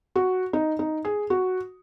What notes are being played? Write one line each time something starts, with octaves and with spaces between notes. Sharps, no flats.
F#4
D#4
D#4
G#4
F#4